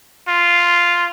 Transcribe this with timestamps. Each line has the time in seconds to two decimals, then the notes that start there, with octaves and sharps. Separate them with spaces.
0.28 F4